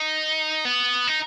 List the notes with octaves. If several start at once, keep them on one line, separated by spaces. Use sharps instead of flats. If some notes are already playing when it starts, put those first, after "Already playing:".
Already playing: D#4
B3
D#4